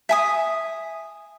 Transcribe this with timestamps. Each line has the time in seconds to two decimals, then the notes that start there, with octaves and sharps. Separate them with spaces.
0.09 E5 G#5 D#6